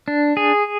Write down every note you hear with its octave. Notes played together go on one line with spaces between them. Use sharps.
D4
G#4